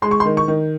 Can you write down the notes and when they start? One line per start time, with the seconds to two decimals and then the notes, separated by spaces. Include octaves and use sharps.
0.02 G#3 C6
0.11 C#6
0.20 C6
0.25 D#3
0.37 C#6
0.48 D#3